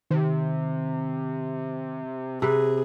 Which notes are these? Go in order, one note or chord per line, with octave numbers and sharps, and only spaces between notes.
C3 D#3
C3 G#4 B4